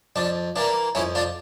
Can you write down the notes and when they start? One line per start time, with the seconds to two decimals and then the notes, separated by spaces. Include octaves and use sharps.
0.16 F2 D4
0.56 E3 A#3 D4
0.95 F2 C#4 E4
1.15 D4 F4